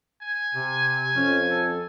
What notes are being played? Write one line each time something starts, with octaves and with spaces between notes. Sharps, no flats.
G#5
C3
F2 C#4
A4